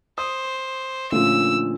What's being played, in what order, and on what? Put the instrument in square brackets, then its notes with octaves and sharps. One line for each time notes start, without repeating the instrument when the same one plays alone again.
[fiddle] C5 [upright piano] D#6
[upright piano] A#2 D3 F3 [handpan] A3 C#4 D4 [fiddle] E6